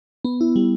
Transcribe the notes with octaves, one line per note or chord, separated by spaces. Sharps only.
B3
E4
G3